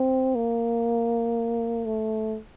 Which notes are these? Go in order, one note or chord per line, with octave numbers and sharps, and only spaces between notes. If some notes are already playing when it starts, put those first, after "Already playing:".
Already playing: C4
A#3
A3